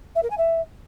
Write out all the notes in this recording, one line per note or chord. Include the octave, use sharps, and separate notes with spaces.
E5
A#4
G#5
E5